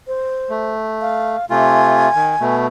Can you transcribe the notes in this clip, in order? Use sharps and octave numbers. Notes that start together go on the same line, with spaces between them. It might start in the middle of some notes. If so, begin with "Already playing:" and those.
C5
A3
F5
C3 A3 F4 G#5
D#3
B2 A3